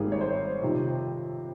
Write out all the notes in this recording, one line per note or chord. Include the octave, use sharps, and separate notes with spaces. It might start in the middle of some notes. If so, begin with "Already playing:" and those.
Already playing: G#1 G#2 D#3 G3 A#3 G#4
C#5
C5
F2 C3 D#3